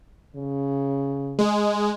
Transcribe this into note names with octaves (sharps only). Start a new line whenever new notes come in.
C#3
G#3